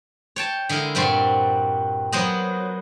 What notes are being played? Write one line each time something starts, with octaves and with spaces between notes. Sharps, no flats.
C#5 G5 A5
D3 G#3 E4 A#4
G2 A#2 G3 C4 F#4 C6
F#3 A#3 B3 C5 D#5